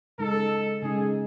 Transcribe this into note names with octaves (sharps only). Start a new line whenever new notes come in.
C#3 G#3 D#4 A4
C#3 G#3 D#4 G#4